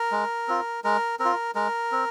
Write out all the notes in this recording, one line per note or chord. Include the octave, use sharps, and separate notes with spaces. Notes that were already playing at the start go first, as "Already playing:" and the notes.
Already playing: A#4
G#3
C4 F4
G#3 A#4
C4 A#4
F4
G#3 A#4
C4